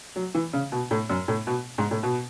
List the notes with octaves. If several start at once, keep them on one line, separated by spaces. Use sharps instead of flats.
F#3
E3
C#3
B2
A2
F#2
A2
B2
G#2
A2
B2